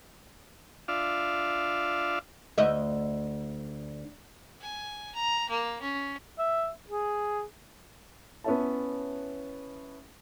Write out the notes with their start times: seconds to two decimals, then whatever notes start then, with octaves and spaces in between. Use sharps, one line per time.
0.88 D4 F4 D5 E5 F5
2.58 D2 D#5 E5
4.61 G#5
5.15 A#5
5.49 A#3
5.82 C#4
6.39 E5
6.90 G#4
8.44 B3 C#4 E4 C#5 E5 A5